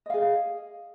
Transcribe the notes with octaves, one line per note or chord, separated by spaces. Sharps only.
G#4 D#5 F5